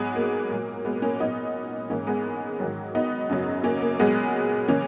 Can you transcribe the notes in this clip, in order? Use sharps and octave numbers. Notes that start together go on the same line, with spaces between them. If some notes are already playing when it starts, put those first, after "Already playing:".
Already playing: G#2 F#3 G#3 B3
A#3
A#2 F#3
G#3 B3
A#3 C#4
A#2 F#3 B3 D#4
G#2 E3 A#3 C#4
G#3 B3
G#2 D#3 F#3
B3 D#4
F#2 C#3 F#3
A#3 C#4
A#3
A#2 F#3 G#3 B3
C#3 E3 A#3 C#4